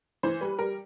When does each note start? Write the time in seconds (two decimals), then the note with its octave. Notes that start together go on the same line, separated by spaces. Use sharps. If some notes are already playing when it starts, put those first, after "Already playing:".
0.23 E3 C5
0.41 G3 B4
0.59 G3 A#4